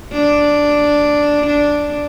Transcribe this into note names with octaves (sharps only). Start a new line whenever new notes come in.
D4
D4